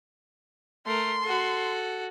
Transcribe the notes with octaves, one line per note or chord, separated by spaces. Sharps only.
A3 A#4 C6
F#4 A4